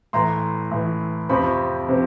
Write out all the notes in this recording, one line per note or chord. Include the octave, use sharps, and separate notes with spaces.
A2 E3 A#5 C6
A2 E3
F2 C3 F3 B5 C#6
C3 F3